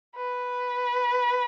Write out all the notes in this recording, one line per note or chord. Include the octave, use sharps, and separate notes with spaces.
B4